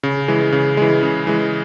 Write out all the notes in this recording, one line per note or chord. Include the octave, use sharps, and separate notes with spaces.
C#3
E3 G#3
C#3
E3 G#3
C#3
E3 G#3